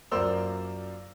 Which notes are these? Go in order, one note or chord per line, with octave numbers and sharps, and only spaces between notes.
F#2 A#3 F4 C5 D5 E6